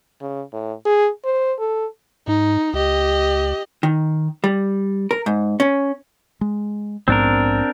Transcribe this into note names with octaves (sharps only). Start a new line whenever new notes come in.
C#3
A2
G#4
C5
A4
G#2 D#4
C#2 G4 D#5
D#3
G3
A#4
G#2
C#4
G#3
A#1 G#2 B3 C4 D4 A#4